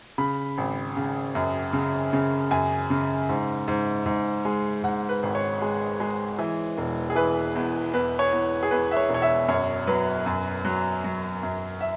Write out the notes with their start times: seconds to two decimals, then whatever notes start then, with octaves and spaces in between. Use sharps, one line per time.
0.18 C#3 B5
0.58 G#1
0.97 C#3
1.35 F#2
1.73 C#3
2.13 C#3
2.51 F#2 G#5
2.90 C#3
3.29 G#2
3.68 G#2
4.06 G#2
4.45 G#3
4.83 G#2 F#5
5.09 B4
5.23 G#1
5.35 C#5
5.62 G#3
6.00 G#3
6.39 E3
6.78 E1
7.10 G#4
7.16 E3 B4
7.55 E2
7.93 E2 B4
8.19 C#5
8.32 E2
8.63 G#4
8.71 E2 B4
8.91 E5
8.97 C#5
9.09 E1
9.14 C#5
9.22 E5
9.48 F#2 C#5
9.87 F#3 B4
10.26 F#2
10.65 F#3
11.04 F#3
11.43 F#2
11.81 E5